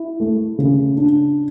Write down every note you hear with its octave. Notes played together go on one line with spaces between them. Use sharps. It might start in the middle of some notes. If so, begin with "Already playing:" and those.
Already playing: E4
A3
C#3
D4